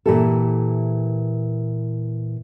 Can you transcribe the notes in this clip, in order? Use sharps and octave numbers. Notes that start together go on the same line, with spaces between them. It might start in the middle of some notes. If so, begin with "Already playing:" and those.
A#2 E3 E4 G4 A4